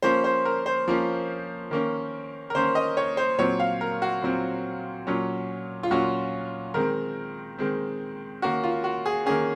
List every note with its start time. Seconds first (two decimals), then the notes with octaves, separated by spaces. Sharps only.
0.03 F3 A#3 C#4 C5
0.24 C5
0.45 A#4
0.66 C5
0.88 F3 A#3 C#4
1.71 D#3 A#3 C#4
2.50 A#4
2.55 D#3 A#3 C#4 C5
2.75 D#5
2.97 C#5
3.17 C5
3.39 A#2 F#3 C4 C#5
3.60 F5
3.81 A#4
4.02 F#4
4.22 A#2 F#3 C4
5.07 A#2 F#3 C#4
5.83 F4
5.91 A#2 F#3 C#4 F#4
6.74 D#3 G#3 C4 A#4
7.58 D#3 G#3 C4
8.42 D#3 A#3 C#4 F#4
8.64 F4
8.84 F#4
9.06 G#4
9.26 D#3 A#3 C#4 G#4